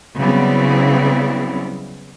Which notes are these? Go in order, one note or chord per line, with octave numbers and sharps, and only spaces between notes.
C#3 F#3 G3 B3 C4 E4